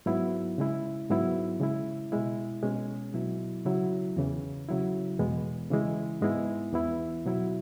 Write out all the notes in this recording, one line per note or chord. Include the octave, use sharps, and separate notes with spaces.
G#2 F#3 B3 E4
C#3 G#3 E4
G#2 F#3 B3 E4
C#3 G#3 E4
B2 G#3 E4
B2 G#3 C#4
B2 F#3 E4
C#3 F#3 E4
E2 C#3 E3
C#3 F#3 E4
E2 B2 G#3 B3
C#3 E3 G#3 E4
G#2 G#3 B3 E4
E2 E3 B3 E4
B2 F#3 E4